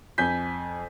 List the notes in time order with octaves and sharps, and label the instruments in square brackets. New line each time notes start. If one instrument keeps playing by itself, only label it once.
[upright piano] F2 G#5 G6 B6